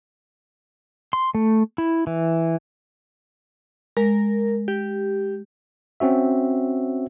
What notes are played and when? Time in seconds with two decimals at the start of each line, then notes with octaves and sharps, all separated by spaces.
1.13 C6
1.35 A3
1.78 E4
2.07 E3
3.97 G#3 A#4
4.68 G4
6.00 C4 C#4 F#4 E5